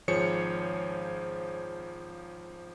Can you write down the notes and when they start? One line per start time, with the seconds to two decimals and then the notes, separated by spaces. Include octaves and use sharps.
0.08 G#1 F3 G#4 C5 C#5 C#7